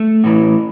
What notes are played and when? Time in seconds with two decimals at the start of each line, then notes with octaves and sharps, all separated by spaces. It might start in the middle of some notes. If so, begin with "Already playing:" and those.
Already playing: A3
0.24 A2 E3